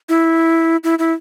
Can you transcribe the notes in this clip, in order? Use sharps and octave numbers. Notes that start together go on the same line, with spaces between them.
E4
E4
E4